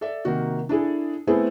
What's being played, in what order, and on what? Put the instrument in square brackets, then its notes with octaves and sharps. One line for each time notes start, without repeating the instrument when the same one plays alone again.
[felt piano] A4 D5 E5
C3 D#3 A#3 F#4
D4 E4 G#4 A4
A3 B3 C4 E4 G#4 A4